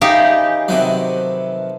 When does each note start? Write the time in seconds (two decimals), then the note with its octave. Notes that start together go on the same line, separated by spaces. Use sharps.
0.01 C#3 E3 D#4 E4 G4 F5
0.68 C3 D#3 F3 F#3 B4 E5